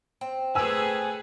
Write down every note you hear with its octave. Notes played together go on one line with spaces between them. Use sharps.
C4
A3 G#4 B4 G#5 E6